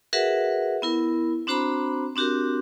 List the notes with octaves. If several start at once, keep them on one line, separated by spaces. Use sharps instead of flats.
F#4 G#4 A#4 B4 E5 F#5
B3 E4 A#4
C4 D4 F#4 C5 A#5 B5
C4 D4 F#4 G4 A#4